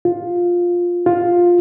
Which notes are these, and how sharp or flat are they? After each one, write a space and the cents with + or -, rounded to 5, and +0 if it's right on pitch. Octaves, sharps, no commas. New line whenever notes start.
F4 +10
F4 +10